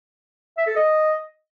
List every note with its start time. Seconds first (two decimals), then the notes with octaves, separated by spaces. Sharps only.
0.57 E5
0.67 A4
0.76 D#5